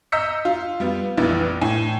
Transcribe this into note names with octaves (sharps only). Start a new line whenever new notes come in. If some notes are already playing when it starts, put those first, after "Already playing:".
D#5 A#5 E6 G6 B6 C#7
F4
G3 B3 F4
F1 A#1 A#2 E3 B3 A6
A2 G#5